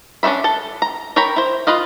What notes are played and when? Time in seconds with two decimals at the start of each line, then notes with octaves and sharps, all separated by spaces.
0.23 C#4 D4 F#4 E5 B5
0.44 A4 A5
0.82 A#5
1.16 A#4 C#5 G5 A#5 B5
1.36 E4 C5
1.67 F4 B4 D#5 F5